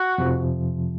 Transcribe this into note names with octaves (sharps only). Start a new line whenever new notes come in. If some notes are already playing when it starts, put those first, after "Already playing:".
Already playing: F#4
F2 C3 F3